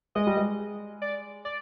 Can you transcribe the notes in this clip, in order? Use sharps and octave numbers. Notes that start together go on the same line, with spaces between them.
G#3 D#5
G3
G#3
D5
D5